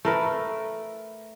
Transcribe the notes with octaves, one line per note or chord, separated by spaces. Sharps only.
A3 A#4 B4